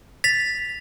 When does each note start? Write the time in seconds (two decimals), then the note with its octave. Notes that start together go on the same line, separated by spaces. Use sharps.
0.24 A6 B6 F7